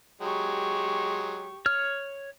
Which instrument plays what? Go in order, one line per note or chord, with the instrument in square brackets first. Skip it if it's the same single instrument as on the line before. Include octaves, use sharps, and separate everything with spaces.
[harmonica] F#3 G#3 [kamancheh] G4 C#6
[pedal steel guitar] C#5 F6